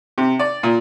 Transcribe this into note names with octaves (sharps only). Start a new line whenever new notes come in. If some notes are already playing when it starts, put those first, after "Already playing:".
C3
D5
A#2